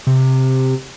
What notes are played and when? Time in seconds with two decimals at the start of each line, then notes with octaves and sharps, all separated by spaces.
0.07 C3